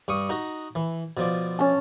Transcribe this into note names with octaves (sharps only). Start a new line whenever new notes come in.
G2 C#6 D#6
D#4 F#4 D#5
E3
B2 F3 D5
C#4 A5